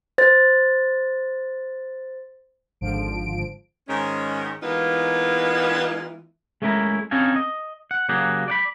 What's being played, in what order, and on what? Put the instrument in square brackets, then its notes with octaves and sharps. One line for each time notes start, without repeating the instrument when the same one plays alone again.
[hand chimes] C5 A6
[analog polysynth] G#1 G#2 D3 F3 D7
[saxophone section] G#2 D#3 G#3 C#4
E3 G#3 A#3 B3 D#4 F4
[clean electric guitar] G#3 A3 C#4 E4 A#4
C4 C#4 D#4 A4 F5 G#5
D#5
F#5
C#3 F#3 A#3 G4 G#4 F#5
D5 F#5 B5